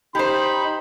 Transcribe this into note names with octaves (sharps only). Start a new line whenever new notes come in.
D#4 G4 C5 B5